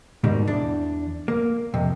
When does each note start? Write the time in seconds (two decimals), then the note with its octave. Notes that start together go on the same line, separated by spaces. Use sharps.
0.24 G#2 B2 D#3 G3
0.47 E2 D4
1.28 A#3
1.74 F2 C3